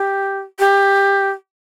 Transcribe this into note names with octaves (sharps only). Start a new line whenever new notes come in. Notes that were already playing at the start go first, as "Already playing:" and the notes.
Already playing: G4
G4